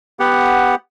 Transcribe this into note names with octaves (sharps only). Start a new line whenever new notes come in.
B3 G4 F#5